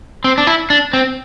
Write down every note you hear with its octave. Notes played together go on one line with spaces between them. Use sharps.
C4
D4
E4
D4
C4